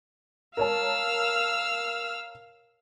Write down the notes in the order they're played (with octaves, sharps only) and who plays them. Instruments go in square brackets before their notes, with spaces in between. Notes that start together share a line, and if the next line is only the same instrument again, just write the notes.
[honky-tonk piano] A#4 C#5 A5 [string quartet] F5 E6 F6